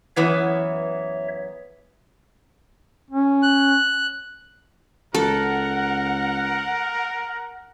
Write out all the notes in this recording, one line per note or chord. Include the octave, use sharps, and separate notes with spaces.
F#2 E3 B3 C#5 E5
C#4
F#6
C#2 A4 A#4 F#5